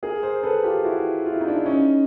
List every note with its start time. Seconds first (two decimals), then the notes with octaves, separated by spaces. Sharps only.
0.03 G#4 A#4
0.23 A#4 C5
0.43 A4 B4
0.63 F4 G4
0.84 E4 F#4
1.25 F4
1.33 E4
1.41 D#4
1.48 D4 E4
1.66 C#4 D#4